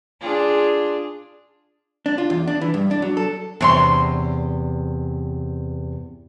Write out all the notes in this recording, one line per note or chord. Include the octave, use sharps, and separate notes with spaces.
D4 F4 G#4
D4
F4
E2
D4
E3
G2
D4
F#3
A4
E2 C3 D4 C#5 C6